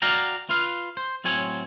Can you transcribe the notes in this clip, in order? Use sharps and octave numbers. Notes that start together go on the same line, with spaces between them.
F#4 D5 F5 G5 A#5
F4 B4 F5
C5
A2 F#3 C4 C#5 G#5